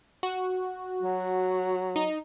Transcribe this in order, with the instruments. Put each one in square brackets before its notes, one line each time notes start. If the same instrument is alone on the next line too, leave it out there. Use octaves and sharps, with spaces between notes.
[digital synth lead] F#4
[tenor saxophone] F#3
[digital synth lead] D#4